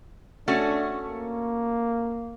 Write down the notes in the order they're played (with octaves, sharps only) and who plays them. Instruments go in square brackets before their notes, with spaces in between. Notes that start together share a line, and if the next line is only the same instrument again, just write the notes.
[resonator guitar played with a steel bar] A3 C#4 F#4 [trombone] D4
[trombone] A#3